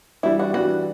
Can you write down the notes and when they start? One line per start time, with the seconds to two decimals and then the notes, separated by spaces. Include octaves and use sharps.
0.23 E3 G3 D4 E4
0.39 F#4
0.54 E3 G3 D4 F#4